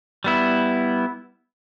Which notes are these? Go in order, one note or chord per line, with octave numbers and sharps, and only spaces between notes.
G3 B3 E4